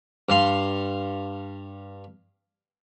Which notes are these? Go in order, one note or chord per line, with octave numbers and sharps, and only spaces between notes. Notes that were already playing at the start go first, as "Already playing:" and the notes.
G2 F5 C6